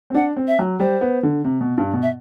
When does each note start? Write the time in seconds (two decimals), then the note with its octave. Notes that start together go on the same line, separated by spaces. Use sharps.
0.10 C4
0.14 D4 F#5
0.36 C4
0.48 E5
0.59 F#3
0.80 G3 C5
1.01 B3
1.23 D3
1.44 C3
1.61 B2
1.78 G2
1.93 B2
2.02 E5